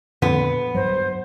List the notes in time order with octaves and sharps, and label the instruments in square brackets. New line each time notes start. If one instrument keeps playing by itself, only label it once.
[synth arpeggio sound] F2 A#2 D3 [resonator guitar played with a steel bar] B3
[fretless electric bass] G2 F#3 [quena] C5